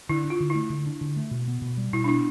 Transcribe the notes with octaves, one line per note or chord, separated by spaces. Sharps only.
D3 E4
D4
F4
D3
E4
A3
D3
D4
D3
A3
B2
B3
B2
G3
B2 E4
D4
B3 E4